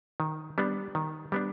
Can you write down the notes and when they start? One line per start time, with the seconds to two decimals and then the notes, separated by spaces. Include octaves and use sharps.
0.20 D#3
0.58 G3 B3 D4
0.95 D#3
1.32 G3 B3 D4